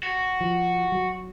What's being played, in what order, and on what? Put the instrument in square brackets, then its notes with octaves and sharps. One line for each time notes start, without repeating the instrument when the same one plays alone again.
[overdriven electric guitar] F#4
[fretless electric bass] F3
F#3